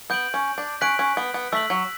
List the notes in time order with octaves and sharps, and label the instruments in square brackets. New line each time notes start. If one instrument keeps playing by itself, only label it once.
[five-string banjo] B3 [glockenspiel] G6 D7 F#7
[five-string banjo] C#4
D4
[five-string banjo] C#4 [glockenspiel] F#6 B6 D7 F#7
[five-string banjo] C#4
B3
B3
[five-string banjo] A3 [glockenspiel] E6 B6 F#7
[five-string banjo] F#3